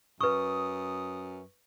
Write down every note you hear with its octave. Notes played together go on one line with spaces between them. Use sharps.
F#2 B4 C#6 D#6